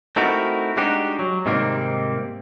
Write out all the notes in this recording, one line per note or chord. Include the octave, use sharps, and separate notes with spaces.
A3 C4 D#4 E4 F#4 A#4
G3 G#3 D4 D#4 F#4 G4
F#3
G#2 C3 D#3 G3 A#3 C4